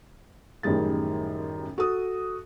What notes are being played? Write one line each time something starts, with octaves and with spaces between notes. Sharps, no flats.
A1 F#2 D#3 G3 G#4 A6
F#4 A4 D#6